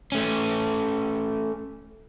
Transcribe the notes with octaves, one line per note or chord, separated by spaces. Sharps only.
A3 C#4